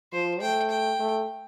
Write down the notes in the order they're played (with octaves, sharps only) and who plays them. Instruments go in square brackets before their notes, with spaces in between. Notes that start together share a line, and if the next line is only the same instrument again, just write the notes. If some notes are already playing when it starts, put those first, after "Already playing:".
[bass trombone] F3 [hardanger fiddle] C5
[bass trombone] A3 [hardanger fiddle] G5
[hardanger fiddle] G5
[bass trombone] A3